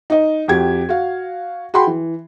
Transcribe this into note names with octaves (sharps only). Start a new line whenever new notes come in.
D#4 D#5
F2 F#4 G4 G#6
F#4 F5
F#4 G#4 G5 B5 C6
E3